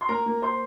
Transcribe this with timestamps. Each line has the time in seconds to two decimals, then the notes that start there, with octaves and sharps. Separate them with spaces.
0.01 C6
0.09 A#3 A#4 A#5
0.26 A#3
0.42 C5 C6